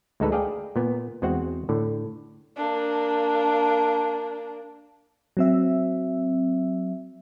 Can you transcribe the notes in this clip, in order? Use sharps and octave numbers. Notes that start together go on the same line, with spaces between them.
D2 G#3 D#4 A4 B4
G#4 D5 D#5 F5 G5
A#2 B3
E2 G#3 C4 F#4 C5 F#5
A2 D3
A#3 D4
F#3 C4 E5